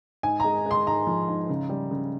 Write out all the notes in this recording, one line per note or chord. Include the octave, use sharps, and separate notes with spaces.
G#2 G#5
G#3 A#5
G#3 C6
G#2 A#5
F3
G#2
C#3
G3
C#3